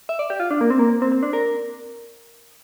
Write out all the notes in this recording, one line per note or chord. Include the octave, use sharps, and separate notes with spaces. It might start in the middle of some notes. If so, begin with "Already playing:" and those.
E5
D5
G4
F4
D4
A#3
C4
A#3
C4
C4
D4
A#4